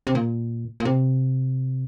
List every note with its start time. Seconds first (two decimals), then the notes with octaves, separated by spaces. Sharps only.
0.07 C3
0.15 A#2
0.80 A#2
0.85 C3